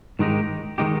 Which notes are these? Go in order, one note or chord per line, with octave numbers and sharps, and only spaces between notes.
G#2 D#3 G#3 D#4 G4
D#3 G#3 D#4 G4